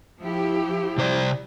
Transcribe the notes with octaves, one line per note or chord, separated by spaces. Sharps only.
F3 E4 G4
C3 C5 D5